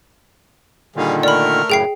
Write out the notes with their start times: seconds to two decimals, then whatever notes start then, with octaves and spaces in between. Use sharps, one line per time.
0.96 A#2 D3 D#3 G3 G#4 F5
1.23 A3 A#4 D5 B5 F6
1.70 F#2 A2 C#3 G#4 G5 C7